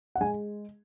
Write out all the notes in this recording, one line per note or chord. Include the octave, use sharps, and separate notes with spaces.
F#5
G#3 G#5